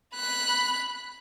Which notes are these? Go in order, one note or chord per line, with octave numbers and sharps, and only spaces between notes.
B5 F#6